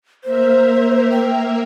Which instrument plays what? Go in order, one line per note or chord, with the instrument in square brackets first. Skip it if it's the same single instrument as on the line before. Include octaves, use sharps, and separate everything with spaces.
[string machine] A#3 A#4 E5 [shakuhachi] C5
[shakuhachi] G5